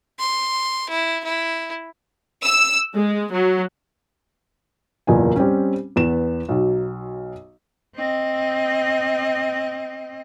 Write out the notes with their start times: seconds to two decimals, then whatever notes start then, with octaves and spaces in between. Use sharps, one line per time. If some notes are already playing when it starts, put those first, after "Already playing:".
0.19 C6
0.90 E4
1.25 E4
2.44 E6
2.93 G#3
3.31 F#3
5.07 F#1 E2 A#2 G#5
5.36 G3 C4 C#4
5.96 E2 B3 E7
6.49 B1 F#3
7.96 C4 D#5